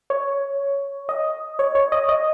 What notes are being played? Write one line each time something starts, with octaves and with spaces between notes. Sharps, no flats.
C#5
D#5
C#5
C#5
D#5
D#5